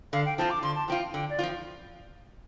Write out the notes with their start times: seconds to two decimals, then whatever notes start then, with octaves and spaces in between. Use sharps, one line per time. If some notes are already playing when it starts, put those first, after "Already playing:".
0.13 D3 F5
0.26 G5
0.38 F3 C4 F4 A5
0.50 D6
0.63 D3 C6
0.75 A5
0.88 F3 C4 F4 G5
1.13 D3 G5
1.30 D5
1.39 F3 C4 F4